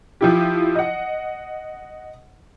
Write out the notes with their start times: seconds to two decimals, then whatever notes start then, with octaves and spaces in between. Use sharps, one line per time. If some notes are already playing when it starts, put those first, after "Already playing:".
0.21 F3 E4 G4
0.75 D#5 F#5